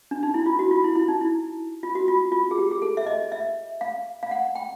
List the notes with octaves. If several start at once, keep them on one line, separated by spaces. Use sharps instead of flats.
D4
D#4
E4
F4
F#4
F4
E4
E4
D#4
E4
F4
F#4
F4
F4
G#4
G4
G#4
A4
E5
D#5
E5
F5
F5
F#5
G5